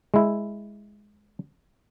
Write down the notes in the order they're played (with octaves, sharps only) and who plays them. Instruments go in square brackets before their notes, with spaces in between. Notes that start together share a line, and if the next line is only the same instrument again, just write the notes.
[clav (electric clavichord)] G#3 E4